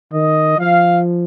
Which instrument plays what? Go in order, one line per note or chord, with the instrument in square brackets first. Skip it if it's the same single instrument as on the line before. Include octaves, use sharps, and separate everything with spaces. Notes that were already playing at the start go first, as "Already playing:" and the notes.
[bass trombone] D#3 [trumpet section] D#5
[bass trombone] F3 [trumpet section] F5